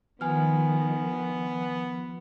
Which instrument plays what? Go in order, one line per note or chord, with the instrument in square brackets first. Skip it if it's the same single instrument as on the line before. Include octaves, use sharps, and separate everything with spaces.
[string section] D#3 [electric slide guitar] F3 [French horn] B3 [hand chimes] G#5 F6